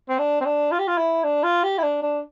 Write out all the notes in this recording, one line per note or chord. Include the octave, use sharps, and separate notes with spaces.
C4
D4
C4
D4
F4
G4
F4
E4
D4
F4
G4
E4
D4
D4